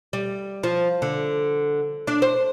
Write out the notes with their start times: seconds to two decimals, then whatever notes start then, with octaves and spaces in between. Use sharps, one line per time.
0.13 G3
0.63 F3
1.02 D3
2.07 D4
2.22 C5